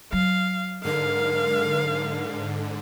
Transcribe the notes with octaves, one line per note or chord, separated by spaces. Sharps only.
F#3 F5
G#2 D3 A#4 F5